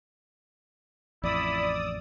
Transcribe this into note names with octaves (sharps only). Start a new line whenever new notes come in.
A1 F2 E4 D5 D#6 E6